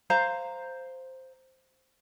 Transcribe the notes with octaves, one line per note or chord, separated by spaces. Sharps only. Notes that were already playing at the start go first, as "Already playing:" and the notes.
C5 F5 A#5